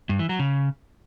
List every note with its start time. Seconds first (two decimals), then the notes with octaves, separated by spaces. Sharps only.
0.09 G2
0.19 E3
0.29 F#3
0.39 C#3